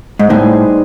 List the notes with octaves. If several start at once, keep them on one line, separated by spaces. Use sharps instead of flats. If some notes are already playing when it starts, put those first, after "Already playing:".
G#2
A2 G3 B3 D#4 G#4 C5